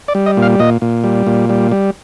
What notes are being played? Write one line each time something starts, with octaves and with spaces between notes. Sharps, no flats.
D5
G3
D#5
A#2
F5
A#2 D#5
A#2
G3
A#2
G3
G3